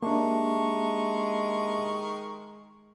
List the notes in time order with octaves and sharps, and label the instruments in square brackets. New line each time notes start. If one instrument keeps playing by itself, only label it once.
[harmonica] D#3 C#6 [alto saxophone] G#3 [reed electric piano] A#3 D4 [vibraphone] G4 E5 A5